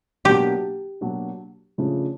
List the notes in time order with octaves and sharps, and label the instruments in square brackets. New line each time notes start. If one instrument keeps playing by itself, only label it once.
[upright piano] B2 F#3 A#3 D4 [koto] G4
[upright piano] B2 F#3 A#3 D4
C#3 F3 A3 D4